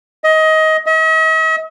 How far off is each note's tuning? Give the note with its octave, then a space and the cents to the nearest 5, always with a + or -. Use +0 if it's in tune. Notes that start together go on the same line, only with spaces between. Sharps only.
D#5 +20
D#5 +45